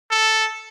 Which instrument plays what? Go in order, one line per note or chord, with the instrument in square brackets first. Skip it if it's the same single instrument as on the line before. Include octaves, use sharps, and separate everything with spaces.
[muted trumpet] A4